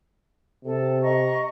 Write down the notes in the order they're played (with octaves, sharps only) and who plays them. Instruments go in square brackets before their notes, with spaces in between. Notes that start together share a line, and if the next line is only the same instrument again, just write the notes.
[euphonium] C3 [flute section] A4
[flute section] D#5 A#5 C#6